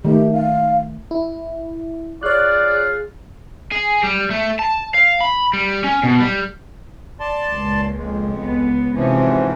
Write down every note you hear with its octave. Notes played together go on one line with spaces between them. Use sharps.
D#3 A3 G4
F5
E4
F4 G#4 C#5 D5 F#6
G#4
G3
A3
A5
F5
B5
G3
C#4
B2
G3
D5 A5 C6
C#2 A#2
F2 G#3
C#2 B3
G#2 C3 E3 F3 C#4